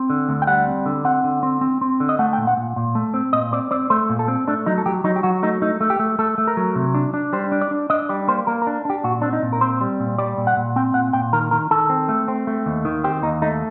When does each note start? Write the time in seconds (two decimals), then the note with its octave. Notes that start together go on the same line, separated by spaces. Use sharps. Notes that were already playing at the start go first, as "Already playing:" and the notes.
Already playing: C4
0.10 D3
0.29 D2
0.42 G5
0.47 G3 F#5
0.66 C4
0.86 D3
1.04 C4 F#5
1.24 D3
1.43 C4
1.61 C4
1.81 C4
2.00 D3
2.09 D#5
2.19 A3 F#5
2.33 G5
2.38 A#2
2.47 F#5
2.57 A#2
2.76 A#2
2.95 A3
3.14 C4
3.33 A#2 D#5
3.53 C4 D5
3.71 C4 D5
3.90 A3 C5
4.10 A#2
4.19 A4
4.28 C4
4.48 A3 D4
4.66 F#3 D#4
4.78 A4
4.86 F#3 G4
5.04 F#3 D#4
5.16 G4
5.23 F#3 F#4
5.43 A3 D#4
5.62 A3 D#4
5.81 A3
5.90 G4
5.99 A3
6.19 A3 A4
6.38 A3
6.47 A#4
6.57 F#3
6.75 C3
6.94 D4
7.14 D4
7.33 G3 C5
7.52 D4
7.61 D5
7.71 D4
7.90 D4 D#5
8.09 G3 D5
8.28 A#3 C5
8.47 A#3 A#4
8.62 A#4
8.67 D4
8.85 D4 G4
9.04 A#2 F#4
9.22 C4 D4
9.33 D#4
9.42 A#2
9.53 A#4
9.61 C4 C5
9.81 G3
10.00 A#2
10.18 G3 D5
10.38 A#2
10.47 F#5
10.57 A#2
10.76 C4 G5
10.94 A#2 F#5
11.13 A#2 G5
11.33 D#3 A#4
11.51 D#3 A#4
11.71 D#3 A4
11.90 C4
12.09 A3
12.28 C4
12.47 A3
12.66 D#2
12.85 D#3
13.04 C4 G4
13.23 D#2 D#4
13.42 A3 D#4